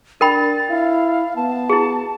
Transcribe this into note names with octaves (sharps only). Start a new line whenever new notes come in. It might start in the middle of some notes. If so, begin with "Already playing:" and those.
D4 A#4 G5 B5 A6
E4 F5
B3 A5
E4 G#4